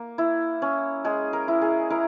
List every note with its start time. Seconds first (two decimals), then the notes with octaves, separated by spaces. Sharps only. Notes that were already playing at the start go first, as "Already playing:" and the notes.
Already playing: A#3
0.18 E4
0.62 C#4
1.05 G#3 G#4
1.33 A#4
1.48 E4
1.62 G#4
1.90 E4 A#4